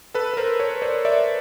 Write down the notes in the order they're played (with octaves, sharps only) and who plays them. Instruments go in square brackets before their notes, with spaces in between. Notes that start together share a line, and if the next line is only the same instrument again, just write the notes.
[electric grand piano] A4 B4
B4
A#4 C5
B4 C#5
C5 D5
D5 E5